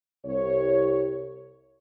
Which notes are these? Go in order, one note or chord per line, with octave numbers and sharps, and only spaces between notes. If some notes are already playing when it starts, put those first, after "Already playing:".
C2 C#5